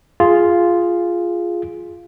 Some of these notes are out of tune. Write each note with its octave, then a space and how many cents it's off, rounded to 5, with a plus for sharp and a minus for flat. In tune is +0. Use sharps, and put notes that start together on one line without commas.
F4 +0 G#4 +0